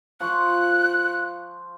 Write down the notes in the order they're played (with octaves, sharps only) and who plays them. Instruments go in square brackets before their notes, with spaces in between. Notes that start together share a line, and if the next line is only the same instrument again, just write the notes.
[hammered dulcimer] F3 C#6 [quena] F#6